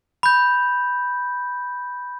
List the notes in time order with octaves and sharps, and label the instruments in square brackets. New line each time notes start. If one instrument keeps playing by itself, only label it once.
[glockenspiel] B5 G6